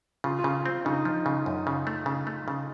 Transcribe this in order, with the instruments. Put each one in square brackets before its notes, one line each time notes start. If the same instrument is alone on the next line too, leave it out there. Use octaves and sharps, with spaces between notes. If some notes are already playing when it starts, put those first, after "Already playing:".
[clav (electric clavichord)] C#3 [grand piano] F4
[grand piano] F4
[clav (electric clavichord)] C#3
C4
[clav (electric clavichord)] C#3 [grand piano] D#4
[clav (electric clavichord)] F3
C#3
F#2
C#3
A3
C#3
A3
C#3